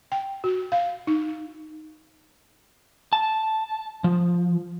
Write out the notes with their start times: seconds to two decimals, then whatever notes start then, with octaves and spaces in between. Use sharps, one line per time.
0.12 G5
0.44 F#4
0.72 F5
1.07 D#4
3.13 A5
4.04 F3